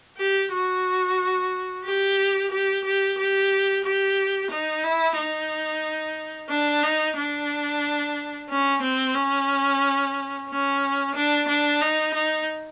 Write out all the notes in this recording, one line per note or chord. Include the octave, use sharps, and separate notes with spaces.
G4
F#4
G4
G4
G4
G4
G4
D#4
E4
D#4
D4
D#4
D4
C#4
C4
C#4
C#4
D4
D4
D#4
D#4